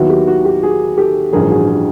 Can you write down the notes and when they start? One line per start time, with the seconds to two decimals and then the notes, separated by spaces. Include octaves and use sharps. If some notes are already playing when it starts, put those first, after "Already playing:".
Already playing: D#2 D#3 F#3 B3 E4 F#4
0.10 G4
0.28 F#4
0.45 G4
0.63 F#4 G#4
0.98 G4 A4
1.33 A1 G2 D3 F3 G#4 A#4
1.50 F#4 G#4
1.67 F#4 G#4